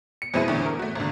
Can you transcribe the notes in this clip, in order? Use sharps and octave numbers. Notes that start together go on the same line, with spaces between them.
C#7
F2 B2 G#3 C4 E4 D#7
E2 A2 D3
A#4
A3 F#4
G#1 D3